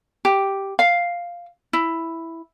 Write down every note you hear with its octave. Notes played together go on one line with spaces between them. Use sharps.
G4
F5
E4